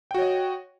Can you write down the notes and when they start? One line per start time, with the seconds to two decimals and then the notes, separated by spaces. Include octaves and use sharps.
0.11 G5
0.14 F#4
0.18 C#5
0.22 D#5